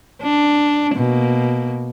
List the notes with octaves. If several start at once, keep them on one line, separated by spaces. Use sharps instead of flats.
D4
B2 A#3